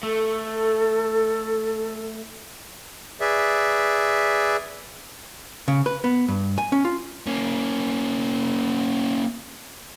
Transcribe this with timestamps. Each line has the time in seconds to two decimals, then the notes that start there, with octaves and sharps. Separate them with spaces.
0.03 A3 A4
3.21 G#4 B4 D5 E5
5.68 C#3
5.86 B4
6.04 B3
6.28 G2
6.58 G#5
6.72 C#4
6.85 F4
7.27 A#3 C#4